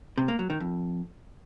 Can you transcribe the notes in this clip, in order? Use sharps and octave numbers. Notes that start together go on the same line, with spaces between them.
C3
A#3
F#3
D#3
F2